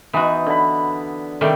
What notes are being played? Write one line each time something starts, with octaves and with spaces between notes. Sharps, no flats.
E3 B3 D#4 F#4
D3 B5
C3 D#3 G3 A3